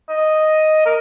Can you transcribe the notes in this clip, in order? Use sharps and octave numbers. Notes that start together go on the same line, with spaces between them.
D#5
A#4